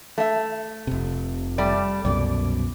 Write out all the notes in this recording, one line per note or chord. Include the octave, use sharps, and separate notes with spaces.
A3 E5
F1 C3
G3 A3 D5
C2 F#2 B2 D5